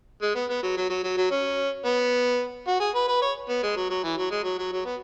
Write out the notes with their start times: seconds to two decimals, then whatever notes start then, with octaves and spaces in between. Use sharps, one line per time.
0.22 G#3
0.36 B3
0.50 B3
0.63 F#3
0.77 F#3
0.90 F#3
1.04 F#3
1.17 F#3
1.31 C#4
1.85 B3
2.68 F#4
2.80 G#4
2.95 B4
3.08 B4
3.22 C#5
3.49 B3
3.63 G#3
3.76 F#3
3.90 F#3
4.04 E3
4.18 F#3
4.31 G#3
4.44 F#3
4.58 F#3
4.72 F#3
4.86 B3